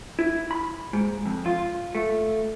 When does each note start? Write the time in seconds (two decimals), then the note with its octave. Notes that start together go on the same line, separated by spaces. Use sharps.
0.19 E4
0.51 B5
0.93 G#2
1.26 F2
1.46 F4
1.95 A3